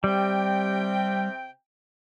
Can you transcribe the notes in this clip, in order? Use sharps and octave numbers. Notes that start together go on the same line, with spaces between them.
C3 G3 C4 G5